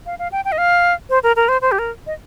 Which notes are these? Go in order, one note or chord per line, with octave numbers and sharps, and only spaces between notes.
F5
F5
G5
G5
D#5
F5
C5
A#4
A#4
C5
C5
G4
A#4
D#5